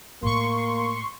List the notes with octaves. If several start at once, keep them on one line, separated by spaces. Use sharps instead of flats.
A2 A3 A#3 C6 C#6